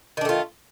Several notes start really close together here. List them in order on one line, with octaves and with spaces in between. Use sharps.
D#3 D4 A3 F4